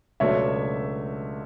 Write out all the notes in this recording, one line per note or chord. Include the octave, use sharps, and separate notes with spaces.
C#2 B2 F#3 A3 D4 C#5 E5